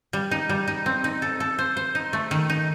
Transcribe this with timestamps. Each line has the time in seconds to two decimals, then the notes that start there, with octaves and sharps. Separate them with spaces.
0.13 G3
0.31 D#4
0.49 G3
0.68 D#4
0.86 C4
1.04 D#4
1.22 A4
1.40 A4
1.59 C5
1.77 C5
1.95 D#4
2.13 A3
2.31 D#3
2.50 D#4